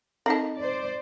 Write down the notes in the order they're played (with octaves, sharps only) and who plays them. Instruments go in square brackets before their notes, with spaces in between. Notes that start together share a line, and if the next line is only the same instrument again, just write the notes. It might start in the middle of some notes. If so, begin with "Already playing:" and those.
[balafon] C4 D#4 D#5 [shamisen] A4 A#4
[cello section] C5 D5